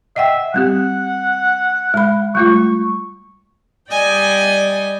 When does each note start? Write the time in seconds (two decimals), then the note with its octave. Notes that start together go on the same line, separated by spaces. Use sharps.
0.16 D#5 E5 F#5 G5
0.54 G3 C4 G4 F#5
1.94 G#3 B5
2.35 G3 A3 F4 C#6
3.90 G3 D5 D#5 G5 G#5